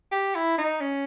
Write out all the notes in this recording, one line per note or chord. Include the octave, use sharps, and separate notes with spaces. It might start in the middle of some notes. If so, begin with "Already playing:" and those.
G4
E4
D#4
C#4